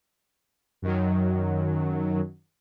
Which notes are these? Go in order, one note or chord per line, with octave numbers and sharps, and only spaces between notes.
F#2 D#3 F#3